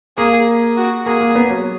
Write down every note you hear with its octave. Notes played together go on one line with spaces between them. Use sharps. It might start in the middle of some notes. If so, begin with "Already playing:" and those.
A#3 G#4
F#4
A#3 G#4
A#3
B3
F#3